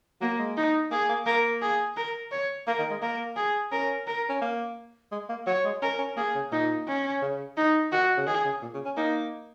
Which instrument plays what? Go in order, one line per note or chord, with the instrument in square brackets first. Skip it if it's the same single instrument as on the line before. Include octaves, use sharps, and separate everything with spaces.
[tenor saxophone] F#3 [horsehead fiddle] A#3
[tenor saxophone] G#3
[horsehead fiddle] D#4
[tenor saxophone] A#3 [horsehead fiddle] G#4
[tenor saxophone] A#3
[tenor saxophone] A#3 [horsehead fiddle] A#4
[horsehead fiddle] G#4
A#4
C#5
[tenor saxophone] A#3 [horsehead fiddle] A#4
[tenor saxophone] D#3
G#3
[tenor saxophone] A#3 [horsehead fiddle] A#4
[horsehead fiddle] G#4
[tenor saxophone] C#4 [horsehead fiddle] A#4
[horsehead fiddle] A#4
[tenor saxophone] C#4
A#3
G#3
A#3
[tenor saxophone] F#3 [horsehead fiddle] C#5
[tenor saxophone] G#3
[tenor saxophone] C#4 [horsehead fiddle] A#4
[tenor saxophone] C#4
[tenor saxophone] A#3 [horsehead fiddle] G#4
[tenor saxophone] C#3
[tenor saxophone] A#2 [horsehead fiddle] D#4
[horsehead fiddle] C#4
[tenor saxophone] C#3
[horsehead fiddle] D#4
[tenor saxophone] D#3 [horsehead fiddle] F#4
[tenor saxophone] C#3
[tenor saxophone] D#3 [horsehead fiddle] G#4
[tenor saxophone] C#3
A#2
C#3
C#4
[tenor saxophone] A#3 [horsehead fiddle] D#4